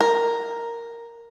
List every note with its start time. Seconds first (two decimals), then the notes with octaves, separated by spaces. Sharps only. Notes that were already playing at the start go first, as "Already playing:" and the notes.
0.01 A#4